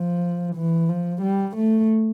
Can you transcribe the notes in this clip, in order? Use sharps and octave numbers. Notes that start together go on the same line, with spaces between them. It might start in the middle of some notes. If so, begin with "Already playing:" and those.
Already playing: F3
E3
F3
G3
A3